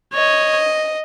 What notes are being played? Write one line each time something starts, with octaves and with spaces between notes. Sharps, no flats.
C#5 D#5